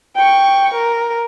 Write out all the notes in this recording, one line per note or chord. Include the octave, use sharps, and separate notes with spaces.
G5 C#6
A#4